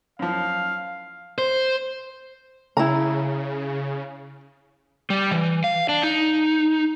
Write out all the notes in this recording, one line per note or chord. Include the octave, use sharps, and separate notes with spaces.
F#2 F3 F5
C5
C#3 E4 A#5
G3
E3
F5
D4
D#4